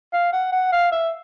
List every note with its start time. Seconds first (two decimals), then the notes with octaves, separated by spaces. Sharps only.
0.13 F5
0.33 F#5
0.53 F#5
0.73 F5
0.92 E5